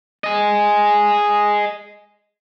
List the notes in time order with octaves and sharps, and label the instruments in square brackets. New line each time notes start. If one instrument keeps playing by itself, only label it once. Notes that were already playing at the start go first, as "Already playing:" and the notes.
[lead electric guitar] G#4 D#5